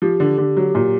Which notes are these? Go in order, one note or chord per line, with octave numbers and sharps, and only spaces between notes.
F3 G4
D3
D3
F#3
A#2